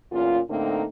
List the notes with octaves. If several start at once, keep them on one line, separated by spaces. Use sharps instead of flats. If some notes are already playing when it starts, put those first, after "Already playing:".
E2 A#2 C#4 F4
A2 D3 A3 A#3 C4 D#4